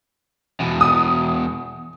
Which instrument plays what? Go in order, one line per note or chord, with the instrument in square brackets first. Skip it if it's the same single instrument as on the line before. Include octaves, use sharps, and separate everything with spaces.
[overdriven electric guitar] E2 B2
[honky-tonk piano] D#6